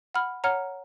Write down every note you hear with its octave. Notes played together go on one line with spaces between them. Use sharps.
F#5 B5 F6
C#5 F#5 A#5 F6